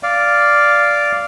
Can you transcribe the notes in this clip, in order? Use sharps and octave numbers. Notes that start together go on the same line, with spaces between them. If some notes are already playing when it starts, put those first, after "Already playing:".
D5 F5